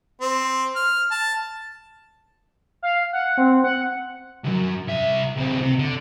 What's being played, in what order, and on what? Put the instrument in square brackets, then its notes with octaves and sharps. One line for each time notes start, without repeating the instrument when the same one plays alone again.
[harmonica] C4
F6
A5
[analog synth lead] F5
F#5
C4
F#5
[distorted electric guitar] C2 F#2
C2 E5
C#2 C4
C3
D3